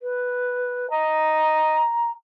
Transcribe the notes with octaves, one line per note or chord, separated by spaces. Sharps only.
B4
D#5 A#5